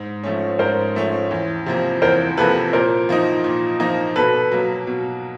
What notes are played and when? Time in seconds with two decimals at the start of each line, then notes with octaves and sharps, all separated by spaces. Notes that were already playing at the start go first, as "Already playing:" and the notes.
Already playing: G#2
0.23 F3 A3 C#4
0.59 G#2 A#4 C5
0.95 F3 A3 C#4
1.31 E2
1.66 C3 F3 A#3
2.02 E2 A#4 C5
2.37 C3 F3 A#3 A4 B4
2.73 A#2 A#4 C5
3.09 F3 A#3 D#4
3.44 A#2
3.80 F3 A#3 D#4
4.16 B2 A4 B4
4.52 F#3 A#3
4.87 B2